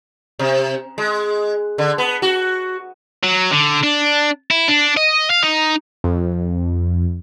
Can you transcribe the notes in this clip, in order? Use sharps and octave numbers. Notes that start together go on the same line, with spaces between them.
C3
G#3
D3
B3
F#4
F#3
D3
D4
E4
D4
D#5
F5
D#4
F2